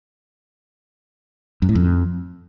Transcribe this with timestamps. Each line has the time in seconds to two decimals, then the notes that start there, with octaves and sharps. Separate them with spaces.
1.62 F#2
1.69 A2
1.75 F2